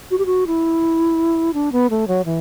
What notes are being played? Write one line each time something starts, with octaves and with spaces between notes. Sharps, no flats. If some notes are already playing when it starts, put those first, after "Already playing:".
F#4
G4
F#4
E4
D4
B3
A3
F#3
E3